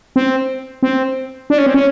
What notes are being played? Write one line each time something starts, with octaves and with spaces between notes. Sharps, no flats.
C4
C4
D4
C#4
C4
C#4